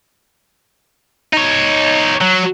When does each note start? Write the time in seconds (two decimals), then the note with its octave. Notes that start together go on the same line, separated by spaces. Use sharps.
1.33 D#4 C#5
2.21 F#3